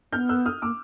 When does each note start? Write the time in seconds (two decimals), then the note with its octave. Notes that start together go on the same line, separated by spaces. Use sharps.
0.12 B3 F6 G6
0.29 E6 F#6
0.46 D#6 F6
0.62 A#3 D6 E6